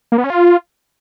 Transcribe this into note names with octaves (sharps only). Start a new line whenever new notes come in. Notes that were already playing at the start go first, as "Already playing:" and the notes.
A#3
B3
C#4
F4